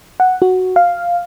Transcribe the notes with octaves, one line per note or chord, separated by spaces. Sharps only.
F#5
F#4
F5